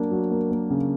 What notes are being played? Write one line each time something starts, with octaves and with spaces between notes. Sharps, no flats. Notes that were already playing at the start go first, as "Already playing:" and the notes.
Already playing: F#3 A#3 D4
F#3
A#3
A#3
C#3